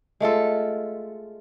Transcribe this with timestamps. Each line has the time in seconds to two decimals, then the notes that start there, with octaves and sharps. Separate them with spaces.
0.20 G#3 A3 F4 A4